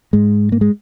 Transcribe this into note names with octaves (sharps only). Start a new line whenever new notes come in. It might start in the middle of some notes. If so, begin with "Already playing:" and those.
G#2 G#3
A#3
G#3